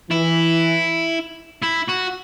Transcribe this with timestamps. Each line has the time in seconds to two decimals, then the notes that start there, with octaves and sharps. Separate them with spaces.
0.11 E3 E4
1.63 E4
1.89 F#4